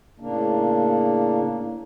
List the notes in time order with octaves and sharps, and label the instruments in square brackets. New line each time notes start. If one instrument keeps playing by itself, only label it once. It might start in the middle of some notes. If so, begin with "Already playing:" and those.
[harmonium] A2 C#3 A#3 D4